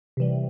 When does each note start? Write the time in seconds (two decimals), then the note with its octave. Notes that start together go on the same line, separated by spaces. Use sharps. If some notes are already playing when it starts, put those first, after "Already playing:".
0.17 C3 E3 G3